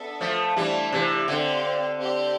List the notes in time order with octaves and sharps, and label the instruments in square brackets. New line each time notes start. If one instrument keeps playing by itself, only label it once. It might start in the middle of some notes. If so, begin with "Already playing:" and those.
Already playing: [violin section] B3 D4 A4 E5
[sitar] F3 A3
[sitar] E3 G3 [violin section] A3 D4 F4 C5
[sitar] C3 E3
[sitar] D3 [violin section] C4 G4 D5 F5
[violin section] C4 G4 D5